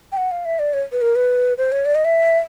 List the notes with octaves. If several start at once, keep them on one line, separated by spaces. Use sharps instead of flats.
G5
F#5
F5
E5
D5
C#5
B4
A#4
B4
C5
C#5
D5
D#5
E5